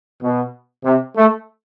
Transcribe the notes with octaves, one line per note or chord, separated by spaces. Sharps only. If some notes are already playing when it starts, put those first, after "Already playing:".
B2
C3
A3